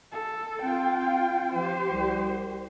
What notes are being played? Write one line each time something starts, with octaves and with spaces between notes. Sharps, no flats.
A4
C4 F4 G5
F3 G4 C5
C2